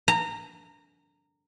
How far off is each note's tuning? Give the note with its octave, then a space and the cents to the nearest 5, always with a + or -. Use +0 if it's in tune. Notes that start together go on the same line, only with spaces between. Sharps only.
A#5 -20